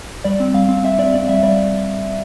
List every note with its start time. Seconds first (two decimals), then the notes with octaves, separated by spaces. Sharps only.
0.24 G3 D5
0.40 C4
0.54 G3 F5
0.69 C4
0.83 C4 E5
0.98 C4 D5
1.14 C4 D5
1.28 G3 E5
1.43 G3 D5